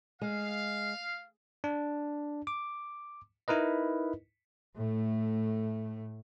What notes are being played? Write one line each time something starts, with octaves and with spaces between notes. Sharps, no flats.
G#3 F5
D4
D6
D#4 E4 A#4 B4 D#5
A2 A3